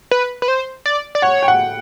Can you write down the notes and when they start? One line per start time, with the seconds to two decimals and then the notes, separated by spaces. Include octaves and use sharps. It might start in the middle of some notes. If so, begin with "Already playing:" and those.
0.11 B4
0.42 B4
0.48 C5
0.86 D5
1.15 D5
1.22 C#5 F#5
1.42 G5
1.48 F#5